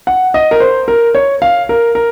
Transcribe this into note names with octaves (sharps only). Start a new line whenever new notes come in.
F#5
D#5
A#4
C5
A#4
C#5
F5
A#4
A#4